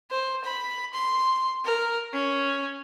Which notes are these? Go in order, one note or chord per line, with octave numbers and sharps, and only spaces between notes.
C5
B5
C6
A#4
C#4